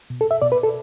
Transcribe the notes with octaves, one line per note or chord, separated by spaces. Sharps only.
B2
A4
E5
B2 D5
B4
A4